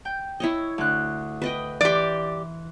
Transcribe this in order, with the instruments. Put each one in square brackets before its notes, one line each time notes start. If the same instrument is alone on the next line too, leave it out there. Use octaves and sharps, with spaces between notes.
[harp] G5
[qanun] E4 C#5 D#5
[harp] D2 F#6
[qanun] B4 D#5 G5
[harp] E3 C6 [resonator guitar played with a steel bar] G4 D5